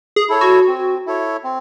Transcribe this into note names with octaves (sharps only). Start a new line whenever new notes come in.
G#4
E4 A4 C#5
F#4
C4
E4 A4 C#5
C4